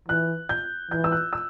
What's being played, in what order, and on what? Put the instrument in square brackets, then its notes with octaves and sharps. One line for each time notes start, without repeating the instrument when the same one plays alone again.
[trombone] E3 [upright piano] F#6
[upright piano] G6
[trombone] E3 [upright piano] G6
[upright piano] E6
F#6
E6